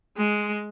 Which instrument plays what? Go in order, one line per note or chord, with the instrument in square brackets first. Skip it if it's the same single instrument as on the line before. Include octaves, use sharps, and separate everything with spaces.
[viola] G#3